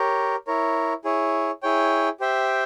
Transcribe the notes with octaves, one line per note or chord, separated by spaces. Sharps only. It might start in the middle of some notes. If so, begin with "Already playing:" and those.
Already playing: G4 A#4 C#5
E4 A#4 C#5
E4 G#4 C#5
E4 G#4 C#5 G5
G4 C5 E5 G5